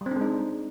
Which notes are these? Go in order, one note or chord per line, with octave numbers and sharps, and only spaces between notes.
G3
C4
D4
G#3
D#4